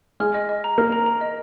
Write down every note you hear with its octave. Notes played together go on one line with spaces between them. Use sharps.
G#3 F6
D#5
D#5
A#5
A#3 F6
A#5
A#5
D#5